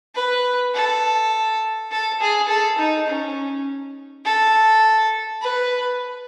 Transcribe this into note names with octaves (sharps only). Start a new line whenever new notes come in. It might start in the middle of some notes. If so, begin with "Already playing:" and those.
B4
A4
A4
G#4
A4
D#4
C#4
A4
B4